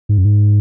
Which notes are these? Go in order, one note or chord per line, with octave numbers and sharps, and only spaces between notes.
G#2
F#2
G#2